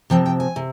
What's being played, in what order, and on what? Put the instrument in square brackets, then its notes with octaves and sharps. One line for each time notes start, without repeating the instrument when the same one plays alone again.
[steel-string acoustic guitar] C3 F3 C4 G5
G5
G#5
C3